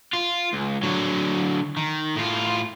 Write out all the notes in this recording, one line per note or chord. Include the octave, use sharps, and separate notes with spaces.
F4
C#2
D3 F#3
D#3
A2 F4